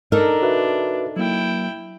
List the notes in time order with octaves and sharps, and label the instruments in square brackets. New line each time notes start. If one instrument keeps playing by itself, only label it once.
[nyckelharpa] D4 [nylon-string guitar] D#4 A4 A#4
[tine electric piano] F#4 B4 E5
[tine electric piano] F#3 A#3 [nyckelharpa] E4 G5